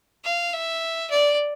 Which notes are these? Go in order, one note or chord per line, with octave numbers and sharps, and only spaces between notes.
F5
E5
D5